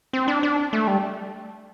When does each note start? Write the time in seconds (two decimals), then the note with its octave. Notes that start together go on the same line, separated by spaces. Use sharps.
0.13 C4
0.28 D4
0.43 D4
0.73 A3
0.87 G3